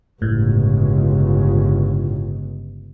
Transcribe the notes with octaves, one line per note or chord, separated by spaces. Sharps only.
G1 C#2 A2